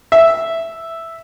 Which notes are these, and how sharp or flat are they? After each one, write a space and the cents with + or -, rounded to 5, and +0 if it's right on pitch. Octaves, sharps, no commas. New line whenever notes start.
E5 +0